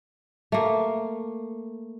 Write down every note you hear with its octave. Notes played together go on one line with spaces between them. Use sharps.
A3 A#3